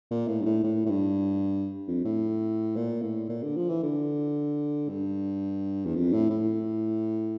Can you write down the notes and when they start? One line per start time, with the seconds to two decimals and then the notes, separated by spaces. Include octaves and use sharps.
0.11 A#2
0.28 A2
0.41 G2
0.45 A2
0.64 A2
0.86 A2
0.90 G2
1.88 F2
2.05 A2
2.76 A#2
3.02 A2
3.29 A#2
3.43 D3
3.56 F3
3.69 E3
3.83 D3
4.89 G2
5.86 E2
5.95 F2
6.13 A2
6.31 A2